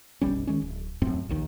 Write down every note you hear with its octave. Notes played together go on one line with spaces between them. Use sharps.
F#1 B1 G3 C#4
D#3 G#3 C#4
D1
D#1 F#2 A2 C4
A#1 D#2 D#3